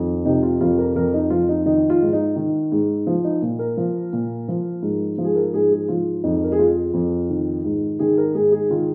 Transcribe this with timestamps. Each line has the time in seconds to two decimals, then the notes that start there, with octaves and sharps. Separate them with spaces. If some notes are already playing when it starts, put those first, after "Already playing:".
Already playing: F2 D#3
0.25 C3 D#4
0.43 F4
0.61 F2 F4
0.78 A#4
0.96 F2 A#4
1.14 D#4
1.30 F3 F4
1.49 D#4
1.66 D#3 D#4
1.90 F4
2.02 G#2
2.13 D#4
2.36 D#3
2.72 G#2
3.07 F3
3.24 D#4
3.42 A#2
3.59 A#4
3.77 F3
4.13 A#2
4.48 F3
4.82 G#2
5.18 F3
5.24 G#4
5.36 A#4
5.54 G#2 G#4
5.72 G#4
5.88 F3 F4
6.24 F2 D#4
6.44 A#4
6.52 G#4
6.59 F3 F4
6.94 F2
7.29 D#3
7.64 G#2
7.99 D#3 G#4
8.18 A#4
8.34 G#2 G#4
8.52 G#4
8.70 D#3 F4